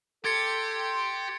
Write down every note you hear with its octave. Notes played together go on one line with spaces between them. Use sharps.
G4 A4 C6 G#6 A6 C#7